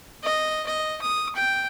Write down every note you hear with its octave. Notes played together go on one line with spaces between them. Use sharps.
D#5
D#5
D#6
G5